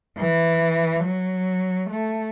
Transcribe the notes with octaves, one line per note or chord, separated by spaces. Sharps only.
E3
F#3
A3